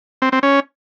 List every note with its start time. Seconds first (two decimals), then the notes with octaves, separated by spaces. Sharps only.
0.22 C4
0.32 C4
0.43 C#4